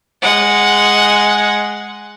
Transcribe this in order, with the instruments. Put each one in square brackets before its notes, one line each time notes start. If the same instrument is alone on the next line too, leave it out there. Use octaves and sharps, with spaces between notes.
[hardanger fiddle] G#3 F#5